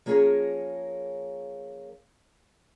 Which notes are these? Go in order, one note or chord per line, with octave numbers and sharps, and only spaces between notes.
F3 A#3 C#4 G#4 A#4 C#5